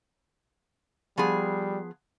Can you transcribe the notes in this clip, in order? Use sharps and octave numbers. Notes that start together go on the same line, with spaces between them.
F3 G3 B3 G#4